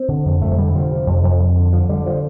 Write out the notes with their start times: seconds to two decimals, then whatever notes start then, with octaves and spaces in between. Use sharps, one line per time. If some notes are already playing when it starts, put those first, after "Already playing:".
Already playing: C4
0.08 D3
0.26 F2
0.42 F2 A3
0.52 F3
0.57 D3 G3
0.75 C3 F3
0.91 C3
1.07 F2
1.23 F2
1.39 F2
1.56 D3
1.72 D3 F3
1.89 D3 G3
2.06 F3